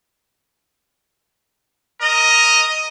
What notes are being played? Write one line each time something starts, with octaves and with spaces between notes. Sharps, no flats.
A#4 D#5